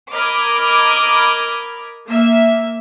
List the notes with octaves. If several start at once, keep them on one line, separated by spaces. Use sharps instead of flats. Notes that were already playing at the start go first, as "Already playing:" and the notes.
A#4 D#5 B5 D6 F6 G#6
A#3 E5